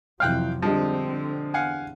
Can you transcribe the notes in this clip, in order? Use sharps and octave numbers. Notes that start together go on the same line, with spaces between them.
F2 C3 E3 F#3 F5 G5 F6 F#6
D3 F3 G3 G#3 C4 D4
E2 F5 F#5 G#5